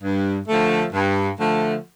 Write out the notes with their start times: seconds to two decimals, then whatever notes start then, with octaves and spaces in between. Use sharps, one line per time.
0.03 G2
0.48 D3 F3 A3
0.93 G2
1.39 D3 F3 A3